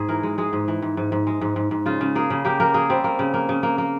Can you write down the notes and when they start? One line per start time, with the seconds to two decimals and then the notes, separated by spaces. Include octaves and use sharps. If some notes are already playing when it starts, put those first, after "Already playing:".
Already playing: G#2 G#4
0.09 E3 A#4
0.23 G#3
0.38 G#3 G#4
0.53 G#2
0.68 E3
0.82 G#2
0.97 G#2
1.12 G#2
1.27 G#3
1.41 G#2
1.56 G#2
1.71 G#2
1.86 C#3 F4
2.01 C#3
2.15 A#3 G#4
2.30 C#3
2.45 A#3 G4
2.60 A#3 A#4
2.74 A#3 G#4
2.90 G3 C4
3.04 A#3
3.19 C#3
3.34 A#3
3.49 C#3
3.63 A#3
3.78 A#3